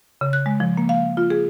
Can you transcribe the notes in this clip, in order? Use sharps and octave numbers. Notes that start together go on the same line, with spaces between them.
C#3
F#6
G#3
F3
A#3
F5
F4
G#4